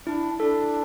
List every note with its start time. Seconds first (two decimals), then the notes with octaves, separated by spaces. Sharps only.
0.06 D4 E4
0.39 D4 A4